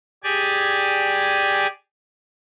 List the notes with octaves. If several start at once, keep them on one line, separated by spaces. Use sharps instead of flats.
G4 G#4 D5 G#5